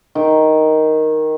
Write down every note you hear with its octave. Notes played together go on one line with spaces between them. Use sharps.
D#3